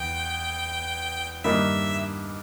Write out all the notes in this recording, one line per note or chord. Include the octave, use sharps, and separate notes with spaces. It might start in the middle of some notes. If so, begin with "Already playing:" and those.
Already playing: E2 G5
G2 D#3 A#3 D#4 E5